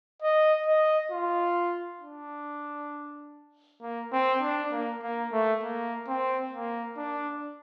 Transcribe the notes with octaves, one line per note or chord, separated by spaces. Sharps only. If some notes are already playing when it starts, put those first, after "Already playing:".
D#5
D#5
F4
D4
A#3
C4
D4
A#3
A#3
A3
A#3
C4
A#3
D4